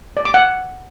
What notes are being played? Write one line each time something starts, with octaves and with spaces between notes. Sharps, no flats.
D5
D6
F#5